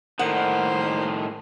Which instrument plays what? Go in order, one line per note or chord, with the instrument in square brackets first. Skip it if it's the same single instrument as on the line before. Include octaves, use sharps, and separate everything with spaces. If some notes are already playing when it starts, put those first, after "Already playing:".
[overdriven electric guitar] A2 D#3 [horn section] A#3 C5 [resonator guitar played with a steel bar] F#5